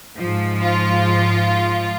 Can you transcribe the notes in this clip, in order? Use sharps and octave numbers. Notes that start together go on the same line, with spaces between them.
G#2 F3
F4